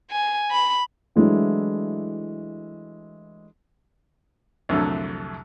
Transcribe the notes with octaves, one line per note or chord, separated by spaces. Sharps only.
G#5
B5
E3 F#3 G#3 A3 D4 E4
C2 F2 D3 F#3 A3